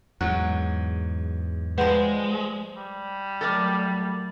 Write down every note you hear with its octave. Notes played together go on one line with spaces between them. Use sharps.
E2 G#2 F#3 F#6
F3 G3 G#3 B4 C5 F#5
G3
F#3 A3 A4 A#4 D5 D6 A6